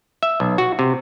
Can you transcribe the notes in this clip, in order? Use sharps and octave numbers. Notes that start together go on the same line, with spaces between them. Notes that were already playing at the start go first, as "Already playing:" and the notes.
E5
B1
F#4
C3